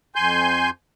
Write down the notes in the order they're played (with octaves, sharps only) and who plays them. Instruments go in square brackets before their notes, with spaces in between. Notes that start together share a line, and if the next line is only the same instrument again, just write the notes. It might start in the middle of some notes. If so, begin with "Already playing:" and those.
[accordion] F2 G#5 C6 G6